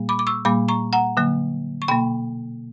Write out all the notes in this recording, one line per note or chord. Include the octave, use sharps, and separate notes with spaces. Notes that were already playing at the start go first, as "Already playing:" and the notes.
Already playing: A#2 G3 A#3
B5 D6
D6
C#6 E6
A#2 G3 A#3 B5 D6
A#5 C#6
F#5 A#5
D3 F#3 A#3
C#6
B2 A#3 G5 B5